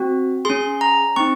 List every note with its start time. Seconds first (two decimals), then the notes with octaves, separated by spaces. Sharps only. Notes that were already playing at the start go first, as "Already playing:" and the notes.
Already playing: C4 F#4
0.45 C#4 G#4 C6
0.81 A#5
1.16 C4 D#4 C#6